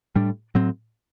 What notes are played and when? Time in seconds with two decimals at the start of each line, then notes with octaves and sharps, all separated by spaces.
0.16 A2 G3 D4
0.55 A2 F#3 C4